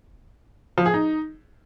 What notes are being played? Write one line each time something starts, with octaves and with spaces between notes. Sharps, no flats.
F3
G#4
D#4